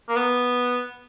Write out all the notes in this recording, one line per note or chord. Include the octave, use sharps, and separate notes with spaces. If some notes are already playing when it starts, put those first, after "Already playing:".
A#3
B3